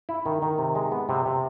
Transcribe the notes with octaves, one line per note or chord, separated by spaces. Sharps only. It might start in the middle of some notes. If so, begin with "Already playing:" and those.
E4
D#3
D#3
C3
G#3
B3
C3
C3